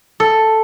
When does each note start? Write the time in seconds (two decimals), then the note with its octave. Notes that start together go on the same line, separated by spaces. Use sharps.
0.20 A4